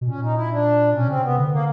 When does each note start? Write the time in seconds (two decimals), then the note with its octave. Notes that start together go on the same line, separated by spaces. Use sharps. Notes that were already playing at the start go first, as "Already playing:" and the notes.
0.01 B2
0.07 A#2 C#4
0.22 D#4
0.36 E4
0.51 D4
0.94 B2 C#4
1.08 C#3 C4
1.16 C3
1.23 B3
1.38 D3
1.51 A#3